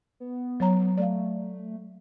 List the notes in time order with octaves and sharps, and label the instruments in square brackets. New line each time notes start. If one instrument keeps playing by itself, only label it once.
[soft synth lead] B3
[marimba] F#3 C#5 A#5
[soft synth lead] A3 [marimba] D5 F5